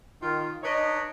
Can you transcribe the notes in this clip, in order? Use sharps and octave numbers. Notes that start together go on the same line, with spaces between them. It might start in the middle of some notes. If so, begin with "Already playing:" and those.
D#3 F4
D4 D#4 B4 C#5 D#5